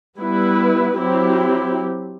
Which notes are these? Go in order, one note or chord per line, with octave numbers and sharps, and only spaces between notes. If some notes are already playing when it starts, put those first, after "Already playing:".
G3 B3 E4 B4
F#3 C4 E4 G4